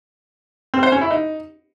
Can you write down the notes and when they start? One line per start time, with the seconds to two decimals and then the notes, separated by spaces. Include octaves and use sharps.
0.74 C4
0.83 C5
0.92 C#4
1.01 E4
1.11 D#4